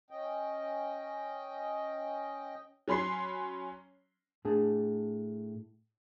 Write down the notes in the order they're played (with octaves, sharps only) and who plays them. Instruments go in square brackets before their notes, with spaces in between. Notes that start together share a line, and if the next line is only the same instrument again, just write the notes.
[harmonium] C#4 D#5 G5
[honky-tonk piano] F#3 C#4 B5 C6 C7
[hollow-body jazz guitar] A2 D4 G#4 A5